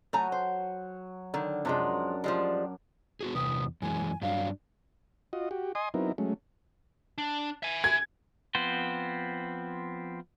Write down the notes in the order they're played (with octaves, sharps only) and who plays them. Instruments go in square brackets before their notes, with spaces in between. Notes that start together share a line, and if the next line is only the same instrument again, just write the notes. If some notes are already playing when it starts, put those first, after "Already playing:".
[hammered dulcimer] F#3 [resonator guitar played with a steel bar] A3 G#5 A#5
[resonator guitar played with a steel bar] C5
D3 D#3
[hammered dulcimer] F#2 D4 A#5 [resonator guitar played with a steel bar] C3 F3 G#3
[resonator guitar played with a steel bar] F3 G3 G#3
[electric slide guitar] B3 F#4 G#4
[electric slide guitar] E2 C3 B4 [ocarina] D#6
[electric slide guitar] F#2 E3 G#3 [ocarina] G#5
[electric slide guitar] G2 F#3 D4 [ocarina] F5
[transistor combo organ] F4 F#4 D#5
F#4 G4
D#5 G#5 C6 D#6
F#3 B3 C4 D#4 E4 A#4
F#3 G#3 A3 C#4
[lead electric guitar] D4
E5 G#5
[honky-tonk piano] G#6
[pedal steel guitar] F3 B3 C4 C5